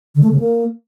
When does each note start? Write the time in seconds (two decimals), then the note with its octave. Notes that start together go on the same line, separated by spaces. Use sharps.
0.15 D3
0.23 A3
0.31 C#3
0.39 A#3